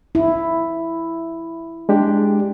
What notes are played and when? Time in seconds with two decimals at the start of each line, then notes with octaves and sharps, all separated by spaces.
0.15 E4
1.89 G#3 D4 G4